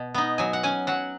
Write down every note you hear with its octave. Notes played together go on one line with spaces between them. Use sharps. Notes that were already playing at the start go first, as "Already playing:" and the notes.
Already playing: B2
B3 D#4
F#3 G#5
F#5
C#4 G#5
F#3 F#5